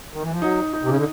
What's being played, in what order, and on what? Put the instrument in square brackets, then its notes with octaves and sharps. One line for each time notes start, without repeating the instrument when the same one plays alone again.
[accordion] D#3
E3
F3
[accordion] F#3 [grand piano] D#4
[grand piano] D#4
[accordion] C3
C#3
D3